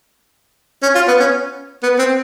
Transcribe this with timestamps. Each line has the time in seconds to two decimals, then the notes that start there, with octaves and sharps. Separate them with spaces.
0.83 C#4
0.95 F4
1.08 B3
1.20 C#4
1.83 B3
1.99 C4